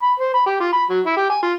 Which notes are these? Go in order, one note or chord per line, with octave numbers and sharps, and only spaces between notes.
B5
C5
B5
G4
F4
B5
F#3
E4
G4
G#5
F4